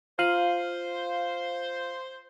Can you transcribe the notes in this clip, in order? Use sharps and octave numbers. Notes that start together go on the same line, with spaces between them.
F4 C5 F5 D#7 F#7